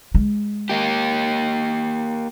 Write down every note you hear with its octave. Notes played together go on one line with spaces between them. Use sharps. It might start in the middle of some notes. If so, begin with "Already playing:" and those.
G#3
A#3 G4